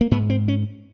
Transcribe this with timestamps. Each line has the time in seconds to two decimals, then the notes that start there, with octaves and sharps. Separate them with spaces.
0.01 A#3
0.11 G#2 B3
0.30 C4
0.48 C#4